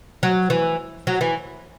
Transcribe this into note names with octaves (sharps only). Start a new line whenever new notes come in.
F#3
E3
F#3
E3